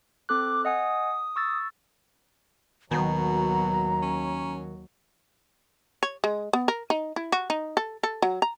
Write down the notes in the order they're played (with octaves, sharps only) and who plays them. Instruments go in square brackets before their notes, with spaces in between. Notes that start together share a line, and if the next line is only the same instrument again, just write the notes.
[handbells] C4 A4 F#6 [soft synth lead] D6
[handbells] D#5 F#5 G#5 [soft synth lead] D#6
[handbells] C#6 E6 A6
[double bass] D#2 F#3 [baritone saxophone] B2 [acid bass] D#3 [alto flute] A#5
[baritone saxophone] C#4
[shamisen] C#5
G#3
B3
A#4
D#4
E4
F#4
D#4
A4
A4
F#3
A#5